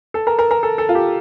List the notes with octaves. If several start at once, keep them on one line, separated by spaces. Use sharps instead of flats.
A4
A#4
A#4
A#4
A4
A4
F4
G4